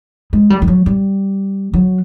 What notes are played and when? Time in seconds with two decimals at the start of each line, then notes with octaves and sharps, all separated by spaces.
0.33 G#3
0.50 G3
0.62 G3
0.68 F#3
0.86 G3
1.73 F#3